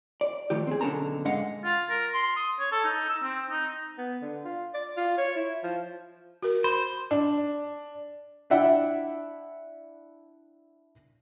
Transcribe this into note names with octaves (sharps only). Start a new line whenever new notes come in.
D5
A2 D#3 F3 G4
C4 G#4
B1 D3 C#4 A4 A5 A#5
G#2 D3 G#3 D#5 F5 F#5
F4
A#4
C6
D#6
C#5
A4
D#4
E6
C4
D#4
B3
D3
F4
D5
F4
C#5
E4
F3
F#4 A#4
C5 B5
D4
D4 E4 D5 E5 F#5 G5